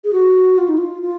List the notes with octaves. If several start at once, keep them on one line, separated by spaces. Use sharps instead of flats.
G#4
F#4
F4
D#4
F4
F4